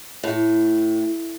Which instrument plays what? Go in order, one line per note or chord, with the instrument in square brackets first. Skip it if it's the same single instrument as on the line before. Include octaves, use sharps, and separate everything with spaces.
[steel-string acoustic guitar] A2